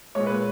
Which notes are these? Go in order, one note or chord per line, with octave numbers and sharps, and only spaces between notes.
A#2 G#3 C#5
B4